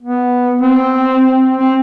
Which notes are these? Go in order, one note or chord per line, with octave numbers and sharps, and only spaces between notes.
B3
C4
C4